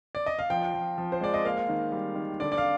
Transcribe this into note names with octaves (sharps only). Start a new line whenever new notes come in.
D5
D#5
F5
F3 G5
F3
F3
C5
G#3 D5
D#5
A#3 F5
D#3
G3
D#3
D3 D5
D5
F5